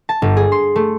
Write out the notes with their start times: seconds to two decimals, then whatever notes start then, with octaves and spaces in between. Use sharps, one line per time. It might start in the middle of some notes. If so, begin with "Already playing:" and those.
0.09 A5
0.22 G1
0.37 G#4
0.52 C6
0.76 A3